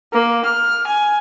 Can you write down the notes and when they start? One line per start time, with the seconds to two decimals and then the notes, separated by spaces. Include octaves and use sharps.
0.13 A#3
0.45 F6
0.87 G#5